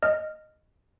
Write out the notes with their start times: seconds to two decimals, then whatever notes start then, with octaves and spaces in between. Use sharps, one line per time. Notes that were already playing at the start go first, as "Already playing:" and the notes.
0.02 D#5 F6